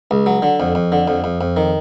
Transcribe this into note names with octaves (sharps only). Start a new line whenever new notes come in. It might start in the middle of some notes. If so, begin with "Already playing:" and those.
C#2
F#3
D3
F2
F2
D3
F2
F2
F2
D#3